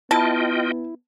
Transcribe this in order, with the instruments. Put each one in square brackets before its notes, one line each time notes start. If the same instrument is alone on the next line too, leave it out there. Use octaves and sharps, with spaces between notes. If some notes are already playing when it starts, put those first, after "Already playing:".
[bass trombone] B3 [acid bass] E4 [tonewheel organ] F4 D#5 G5 [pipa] A5